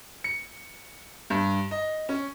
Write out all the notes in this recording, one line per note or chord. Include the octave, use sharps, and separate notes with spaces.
C#7
G2
D#5
C#4